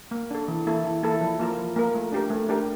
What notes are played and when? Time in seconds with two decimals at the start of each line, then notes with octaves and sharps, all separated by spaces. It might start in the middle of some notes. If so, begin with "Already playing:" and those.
0.11 A#3
0.31 D4 A4
0.48 E3
0.67 A#3 E4 A4
0.85 E3
1.03 A#3 E4 A4
1.21 F3
1.39 A#3 F4 A#4
1.58 F3
1.76 A#3 F4 A#4
1.94 A3
2.12 D4 G4 A#4
2.30 A3
2.49 D4 G4 A#4